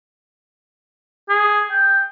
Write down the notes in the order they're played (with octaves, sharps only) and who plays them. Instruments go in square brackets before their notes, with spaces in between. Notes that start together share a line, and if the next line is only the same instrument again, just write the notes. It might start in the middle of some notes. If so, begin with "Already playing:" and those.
[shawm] G#4
G5